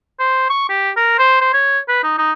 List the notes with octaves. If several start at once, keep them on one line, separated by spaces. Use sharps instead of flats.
C5
C#6
G4
A#4
C5
C5
C#5
B4
D#4
D#4